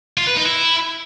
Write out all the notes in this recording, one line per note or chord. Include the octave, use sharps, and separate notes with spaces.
F4
B4
D#4
E4